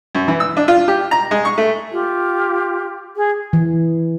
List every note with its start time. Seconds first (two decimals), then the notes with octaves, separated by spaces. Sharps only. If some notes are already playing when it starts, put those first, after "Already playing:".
0.15 F#2
0.28 E3
0.40 E6
0.57 D4
0.68 F4
0.88 G4
1.11 A#5
1.31 G#3
1.45 C#6
1.58 A3
1.91 F4 G4
3.16 G#4
3.53 E3